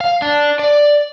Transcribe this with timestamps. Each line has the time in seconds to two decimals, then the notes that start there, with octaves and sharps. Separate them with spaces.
0.01 F5
0.22 D4
0.59 D5